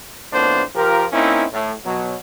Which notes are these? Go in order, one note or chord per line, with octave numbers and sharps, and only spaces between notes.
F2 A2 A#3 B3 D4 C5
F3 F4 G4 A#4
A#3 C4 C#4 D#4 E4
A2
B2 F#3